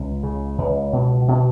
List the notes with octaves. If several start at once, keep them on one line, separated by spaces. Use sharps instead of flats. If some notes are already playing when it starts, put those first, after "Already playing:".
Already playing: C#2 C#4
C#3
C#2
B2
B2